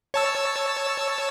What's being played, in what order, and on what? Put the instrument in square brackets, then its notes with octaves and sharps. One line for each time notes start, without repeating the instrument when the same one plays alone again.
[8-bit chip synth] C#5 A5 E6